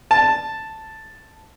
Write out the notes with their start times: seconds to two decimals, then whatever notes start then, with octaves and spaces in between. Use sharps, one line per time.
0.11 A5